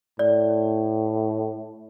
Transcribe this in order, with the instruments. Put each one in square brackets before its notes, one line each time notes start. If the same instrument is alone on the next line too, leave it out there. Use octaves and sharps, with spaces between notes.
[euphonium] A2 [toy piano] D5